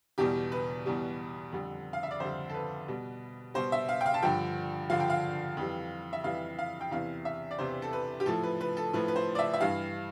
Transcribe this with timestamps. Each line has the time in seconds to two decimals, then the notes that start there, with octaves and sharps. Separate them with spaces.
0.18 E2 B2 G3 G4
0.52 B4
0.86 E2 B2 G3
1.52 F2 D3 G3
1.93 F5
2.03 E5
2.11 D5
2.20 F2 D3 G3 C5
2.50 A4
2.54 B4
2.88 B2 G3
3.54 B2 G3 C5
3.72 E5
3.89 F5
4.01 G5
4.06 F5
4.14 A5
4.23 G2 D3 F3 G5
4.90 G2 D3 F3 F5
5.00 G5
5.10 F5
5.57 F2 E3 G3
6.13 E5
6.24 F2 E3 G3 F5
6.59 F5
6.81 G5
6.91 E2 C3 E3 F5
7.25 E5
7.51 D5
7.58 E2 C3 E3 C5
7.82 A4
7.93 B4
8.20 G4
8.26 A2 F3 A4
8.43 B4
8.61 B4
8.77 A4
8.93 A2 F3 B4
9.08 B4
9.16 C5
9.35 D5
9.39 E5
9.54 E5
9.61 G2 E3 G3 F5